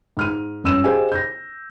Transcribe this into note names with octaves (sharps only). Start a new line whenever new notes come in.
G#2 F6 D#7
G1 C#4 E6 D#7 E7
G4 G#4 C5 D#5 F5 G#5
G6 A#6